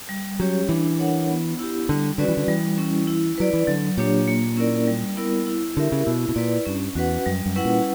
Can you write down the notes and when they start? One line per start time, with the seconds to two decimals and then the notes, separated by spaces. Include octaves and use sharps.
0.09 G3
0.40 F#3 C#4 G4 C#5
0.69 E3 D4
0.99 A#4 C#5 F#5
1.29 B3
1.59 E4 G4
1.89 D3 G3
2.18 D3 C#4 F#4 B4 D5
2.28 E3
2.37 D3
2.48 E3 G3
2.78 C#4 E4
3.07 E4
3.38 F#3 B4 D5
3.53 E3
3.67 D3 F#3
3.97 A#2 A#3 D4 G4 C#5
4.27 A#3
4.57 C#4 E4 A#4 D5
4.87 G3
5.17 B3 E4 A#4
5.47 E4
5.76 D3 G4 A#4 E5
5.92 C#3
6.06 B2 E4
6.29 B2
6.36 A#2 B4 D5
6.65 G2 C#4
6.95 E2 F#4 B4 F#5
7.26 F#2 G3
7.46 F#2
7.56 C#4 E4 B4 F#5
7.65 A#2